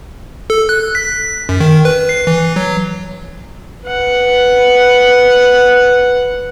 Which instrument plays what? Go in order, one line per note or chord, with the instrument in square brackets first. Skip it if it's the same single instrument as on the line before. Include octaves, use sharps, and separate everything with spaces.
[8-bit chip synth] A4
F#6
B6
F#2
D#3
B4
C7
E3
F#3
[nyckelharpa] B4 F#5